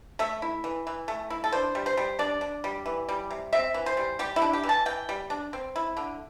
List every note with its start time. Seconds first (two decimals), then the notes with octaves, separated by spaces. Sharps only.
0.19 A3 E5
0.42 E4
0.64 E3
0.87 E3
1.08 A3
1.30 E4
1.44 A4
1.52 D4 C5
1.75 G3
1.86 C5
1.97 G3
2.19 D4 D5
2.41 D4
2.64 G3
2.86 E3
3.09 G3
3.31 C3
3.53 C4 E5
3.74 E3
3.86 C5
3.97 G3
4.19 G3 G4
4.36 E4
4.42 D4
4.53 G4
4.63 E3
4.69 A5
4.86 E3 G5
5.09 G3
5.30 D4
5.53 C4
5.76 E4
5.97 D3